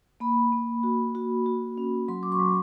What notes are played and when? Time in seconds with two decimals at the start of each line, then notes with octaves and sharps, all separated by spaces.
0.20 A#3 B5
0.52 A#3
0.83 F#4
1.15 F#4
1.46 F#4
1.78 C#4
2.08 F#3 C6
2.23 D6
2.32 C#6
2.39 F#3